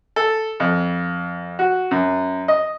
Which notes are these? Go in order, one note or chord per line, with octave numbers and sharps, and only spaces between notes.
A4
F2
F#4
F#2
D#5